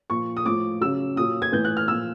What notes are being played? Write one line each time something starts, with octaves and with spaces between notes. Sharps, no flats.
A#2 F3 C#6
D#6
A2 F3 D6
C#3 F#3 E6
A#2 F#3 D#6
G#6
A2 E3 G6
F#6
F6
A#2 F3 E6